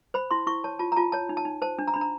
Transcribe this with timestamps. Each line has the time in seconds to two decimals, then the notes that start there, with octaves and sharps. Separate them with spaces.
0.14 C5 B5
0.31 E4 C6
0.47 E4 C#6
0.64 C#5 A5
0.79 F4 A5
0.92 A#5
0.96 F4 A5
1.12 C#5 A5
1.29 D#4
1.37 A5
1.45 D#4
1.62 C5 A5
1.79 D4
1.88 A#5
1.94 D4 B5
2.01 A#5